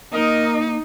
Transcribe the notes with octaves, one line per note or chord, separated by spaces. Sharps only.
A#3 D#4 A#4 D#5